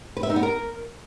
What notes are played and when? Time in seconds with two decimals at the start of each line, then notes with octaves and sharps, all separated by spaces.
0.17 B4
0.23 E5
0.30 D#4
0.36 B3
0.43 A#4